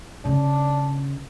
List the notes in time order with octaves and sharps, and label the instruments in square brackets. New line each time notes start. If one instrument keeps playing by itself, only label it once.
[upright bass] C#3 [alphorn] D4